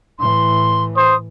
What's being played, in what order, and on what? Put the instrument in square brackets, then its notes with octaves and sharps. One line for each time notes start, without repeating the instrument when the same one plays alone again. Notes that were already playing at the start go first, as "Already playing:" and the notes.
[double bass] A2 E3 [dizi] C6
[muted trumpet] C5 [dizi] D#6